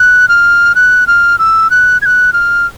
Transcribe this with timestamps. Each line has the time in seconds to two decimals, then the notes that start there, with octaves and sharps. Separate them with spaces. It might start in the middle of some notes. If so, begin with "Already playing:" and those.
Already playing: F#6
0.29 F6
0.75 F#6
1.07 F6
1.39 E6
1.70 F#6
2.02 G#6
2.06 F#6
2.33 F6